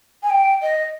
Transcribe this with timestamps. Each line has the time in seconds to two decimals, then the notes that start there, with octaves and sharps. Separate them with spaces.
0.22 G#5
0.29 G5
0.62 D#5